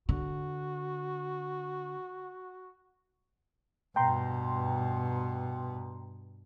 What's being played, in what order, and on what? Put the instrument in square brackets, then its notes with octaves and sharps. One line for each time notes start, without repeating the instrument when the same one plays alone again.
[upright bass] D3 [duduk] F#4
[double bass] G2 B2 [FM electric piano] G5 A#5 C6